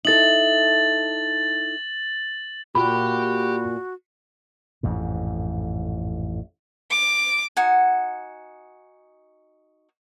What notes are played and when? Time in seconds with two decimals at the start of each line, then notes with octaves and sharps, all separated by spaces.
0.05 D#4 E4 A4 A6 F#7
2.75 A#2 F#4 G4 G5 B5
4.83 A1 F2 G#2
6.90 D6
7.57 D#4 F#4 F#5 G#5